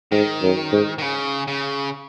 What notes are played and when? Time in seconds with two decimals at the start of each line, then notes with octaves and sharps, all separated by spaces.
0.12 G#2 D#3
0.42 F#2
0.72 G#2
0.98 D#3
1.02 C#3
1.48 C#3